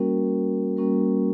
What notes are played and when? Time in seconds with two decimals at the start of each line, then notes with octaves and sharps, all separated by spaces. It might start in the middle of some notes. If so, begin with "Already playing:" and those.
Already playing: G3 A#3 C#4 F#4 A#4
0.77 G3 A#3 C#4 F#4 A#4